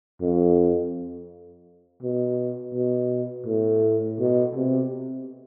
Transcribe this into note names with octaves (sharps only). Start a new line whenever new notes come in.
F2
B2
B2
A2
B2
C3